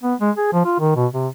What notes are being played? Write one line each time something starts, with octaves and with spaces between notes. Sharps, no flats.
B3
G#3
G#4
F3
F4
D#3
B2
C3